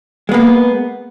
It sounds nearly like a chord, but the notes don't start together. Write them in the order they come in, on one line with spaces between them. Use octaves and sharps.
G#3 B3 A#3